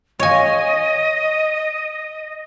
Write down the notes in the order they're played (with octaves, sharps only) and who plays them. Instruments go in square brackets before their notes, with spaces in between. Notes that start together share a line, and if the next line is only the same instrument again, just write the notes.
[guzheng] C#5 G#5 [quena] D#5